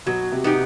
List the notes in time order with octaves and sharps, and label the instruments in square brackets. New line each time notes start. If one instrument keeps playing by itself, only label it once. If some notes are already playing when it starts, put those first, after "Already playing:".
[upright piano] B2 [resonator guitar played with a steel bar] F#3
[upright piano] C3
[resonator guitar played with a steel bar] B3 D#4 G4